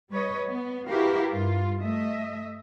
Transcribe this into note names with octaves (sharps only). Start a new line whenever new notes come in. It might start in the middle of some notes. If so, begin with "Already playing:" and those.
G3 B4 C#5 D#5
B3
E4 F#4 G4 A#4 B4 F5
G2 F4
A3 D#5 E5